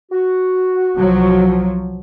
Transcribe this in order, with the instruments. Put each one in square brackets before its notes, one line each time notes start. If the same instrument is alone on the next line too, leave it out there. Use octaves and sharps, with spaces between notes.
[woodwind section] F#4
[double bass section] C2 F3 F#3